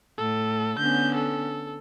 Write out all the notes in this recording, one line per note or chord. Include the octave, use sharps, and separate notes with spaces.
A2 A4
D3 B3 C#4 G6
A4